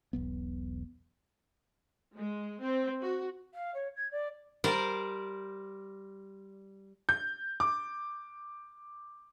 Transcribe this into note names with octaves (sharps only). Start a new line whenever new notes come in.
E1 B1 B3
G#3
C4
F#4
F5
C#5
G#6
D5
G3 A#4 C5 D5
G6
D6